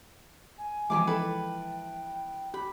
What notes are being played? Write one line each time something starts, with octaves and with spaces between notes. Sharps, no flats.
G#5
E3 F3 G#3 G4 G#4 D6
E4 A4 B4 G5
G4 B5